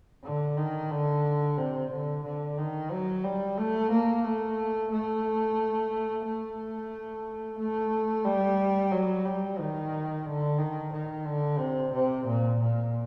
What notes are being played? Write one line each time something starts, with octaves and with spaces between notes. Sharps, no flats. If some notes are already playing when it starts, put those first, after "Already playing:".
D3
D#3
D3
C3
D3
D3
D#3
F#3
G3
A3
A#3
A3
A3
A3
A3
G3
F#3
G3
D#3
D3
D#3
D#3
D3
C3
C3
A#2
A#2